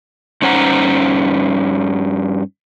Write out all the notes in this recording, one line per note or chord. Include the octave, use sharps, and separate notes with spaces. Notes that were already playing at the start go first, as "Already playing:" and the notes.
G2 C#4 D#4 C5 F#5 A#5